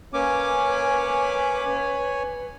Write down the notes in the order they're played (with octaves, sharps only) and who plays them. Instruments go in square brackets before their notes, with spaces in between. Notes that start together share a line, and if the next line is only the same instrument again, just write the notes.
[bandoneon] A#3 C#4 D6 [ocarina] B4 [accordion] C#5 G#5